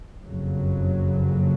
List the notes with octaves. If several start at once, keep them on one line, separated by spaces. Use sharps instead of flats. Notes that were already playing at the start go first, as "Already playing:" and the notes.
F#1 F2 C#3 F#3